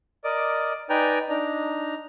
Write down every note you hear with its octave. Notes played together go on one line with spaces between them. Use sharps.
A#4 D5 D#5 D6
D#4 B4 D5 G5 G#5 A#5
D4 D#4 A#5